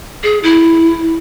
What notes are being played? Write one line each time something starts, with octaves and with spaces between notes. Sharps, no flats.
G#4
E4